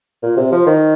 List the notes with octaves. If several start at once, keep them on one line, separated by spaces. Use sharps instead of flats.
A#2
C3
F3
D#3